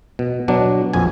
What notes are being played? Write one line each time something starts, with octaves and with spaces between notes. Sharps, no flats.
B2
B2 F#3 D4
A#1 F2 G#5